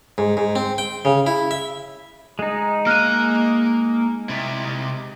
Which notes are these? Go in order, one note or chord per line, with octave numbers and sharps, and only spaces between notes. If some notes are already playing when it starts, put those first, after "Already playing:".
G#2
G#2
C4
G5
C#3
E4
E5
G#3 D#4
A#3 F5 F6 F#6 D#7
C3 E4